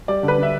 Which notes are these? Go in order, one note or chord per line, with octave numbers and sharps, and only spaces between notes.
G3 D5
D3
B4
D3 E5